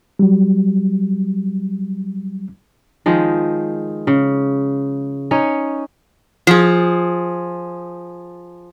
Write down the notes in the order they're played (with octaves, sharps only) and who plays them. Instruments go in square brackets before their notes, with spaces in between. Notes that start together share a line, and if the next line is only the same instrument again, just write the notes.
[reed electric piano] F#3 G3
[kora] D#3 F3 G#3
C#3
C#4 D#4 C#5
[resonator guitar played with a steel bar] F3 G#4